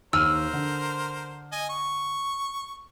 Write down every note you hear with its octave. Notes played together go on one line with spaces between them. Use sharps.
D#2 A#4 C5 E6 F6 D#7
D3
D#5 G#5
C#6